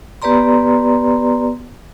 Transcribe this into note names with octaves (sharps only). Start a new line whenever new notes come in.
B3 G4 B4 D5 A#5 C6